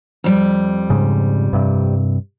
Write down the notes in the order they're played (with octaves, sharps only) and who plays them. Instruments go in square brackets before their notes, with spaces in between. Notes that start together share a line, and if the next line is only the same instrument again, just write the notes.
[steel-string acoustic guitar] F2 G3
[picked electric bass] G#2 C#3
G2 C3